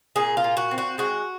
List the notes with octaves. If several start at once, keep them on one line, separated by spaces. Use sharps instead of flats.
A#2 G#4
F4
A#2
F#4
C4
F#4
G#3 F#4